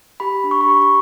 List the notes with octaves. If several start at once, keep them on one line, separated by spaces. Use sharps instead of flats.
G4 B5
D4
C#6
B5
G4 C#6
C#6